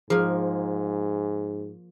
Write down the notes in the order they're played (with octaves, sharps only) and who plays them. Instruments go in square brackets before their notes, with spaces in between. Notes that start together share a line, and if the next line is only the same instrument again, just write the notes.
[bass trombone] G#2 [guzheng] F3 A#3 [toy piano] G#4